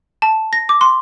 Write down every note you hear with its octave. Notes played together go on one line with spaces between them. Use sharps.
A5
A#6
D6
C6